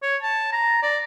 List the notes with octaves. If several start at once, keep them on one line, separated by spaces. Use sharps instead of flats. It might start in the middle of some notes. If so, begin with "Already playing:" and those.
C#5
A5
A#5
D5